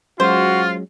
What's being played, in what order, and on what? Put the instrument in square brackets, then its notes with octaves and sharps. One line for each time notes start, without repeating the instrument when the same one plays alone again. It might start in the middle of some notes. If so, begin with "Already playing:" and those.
[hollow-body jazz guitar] F#3 G#3 C#4 [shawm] F4 [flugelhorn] F#4 [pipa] C5